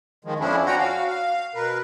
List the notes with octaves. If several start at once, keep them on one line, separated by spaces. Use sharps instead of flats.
D#3 F3 G#3
F2 F3 C#4 D4 E4
C#4 D4 F#4 F#5 G5 A#5
F#4 F5
F5
B2 A#4 B4